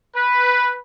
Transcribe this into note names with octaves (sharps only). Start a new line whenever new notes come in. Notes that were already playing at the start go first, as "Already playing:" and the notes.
B4